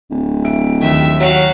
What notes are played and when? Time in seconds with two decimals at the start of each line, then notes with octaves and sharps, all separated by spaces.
0.10 D1
0.44 E5 D7
0.81 D#2 D#3 E5 E6
1.20 F#3 F#4 F5